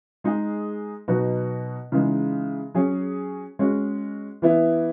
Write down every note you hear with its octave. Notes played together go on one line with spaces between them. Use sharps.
G#3 D#4 G#4
B2 F#3 B3 D#4 F#4
C#3 E3 G#3 D#4
F#3 C#4 G#4
G#3 C#4 F#4
E3 B3 E4